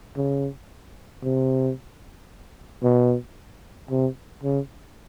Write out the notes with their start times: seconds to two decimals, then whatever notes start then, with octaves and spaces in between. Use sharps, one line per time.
0.17 C#3
1.23 C3
2.83 B2
3.91 C3
4.43 C#3